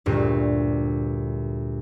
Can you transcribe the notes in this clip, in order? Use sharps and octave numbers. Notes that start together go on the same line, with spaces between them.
D2 G2 A#2